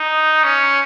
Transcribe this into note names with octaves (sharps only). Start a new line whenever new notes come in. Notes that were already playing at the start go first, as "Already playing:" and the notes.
Already playing: D#4
C#4